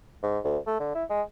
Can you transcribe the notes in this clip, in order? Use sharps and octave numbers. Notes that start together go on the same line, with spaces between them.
G#2
D2
A3
D3
E4
G#3